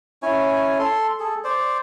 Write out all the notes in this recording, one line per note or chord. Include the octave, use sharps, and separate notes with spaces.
C#4 E4 C#5 G#5
A4 C6
G#4 A4
C5 D5